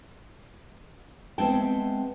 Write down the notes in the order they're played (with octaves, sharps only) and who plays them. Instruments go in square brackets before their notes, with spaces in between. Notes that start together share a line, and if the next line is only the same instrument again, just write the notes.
[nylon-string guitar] G#3 B3 C4 E5 G5 A5